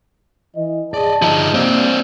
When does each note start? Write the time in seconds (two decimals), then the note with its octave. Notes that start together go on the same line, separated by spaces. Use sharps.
0.57 E3 D#5
0.94 G#4 D5 D#5 A5
1.22 F3 D#4 G4 A#5
1.54 C3 A#3 C4 D4